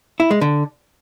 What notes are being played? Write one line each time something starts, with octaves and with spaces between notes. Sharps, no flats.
E4
G#3
D3